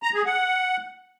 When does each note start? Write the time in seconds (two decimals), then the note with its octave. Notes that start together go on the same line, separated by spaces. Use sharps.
0.03 A#5
0.14 G#4
0.26 F#5